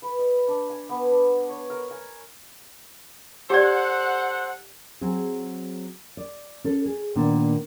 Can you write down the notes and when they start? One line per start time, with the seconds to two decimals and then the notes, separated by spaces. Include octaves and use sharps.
0.02 B4
0.19 D#5
0.48 D4
0.70 G#5
0.89 B3
1.11 D4
1.49 C#5
1.70 A#4
1.91 G#5
3.50 G4 A4 C5 D5 F#5
5.01 F#3 C4 G#4
6.17 D5
6.64 C#4 A4
6.85 G#4
7.16 A#2 D#3 A#3 B3 D4